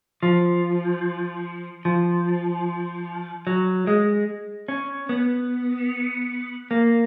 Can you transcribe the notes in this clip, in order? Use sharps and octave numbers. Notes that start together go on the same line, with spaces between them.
F3
F3
F#3
G#3
C#4
B3
A#3